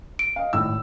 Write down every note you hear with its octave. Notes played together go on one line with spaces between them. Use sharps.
D7
D#5 F5
G#1 A2 E6